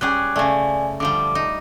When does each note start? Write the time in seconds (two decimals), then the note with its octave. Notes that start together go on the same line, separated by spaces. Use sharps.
0.01 G3 C#4 G#4 G5 D6 F#6
0.36 C#3 A3 D5 G#5
1.00 D3 F3 G3 D6
1.35 D#4